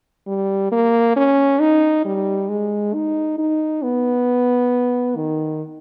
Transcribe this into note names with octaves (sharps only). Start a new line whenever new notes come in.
G3
A#3
C#4
D#4
G3
G#3
D#4
D#4
B3
D#3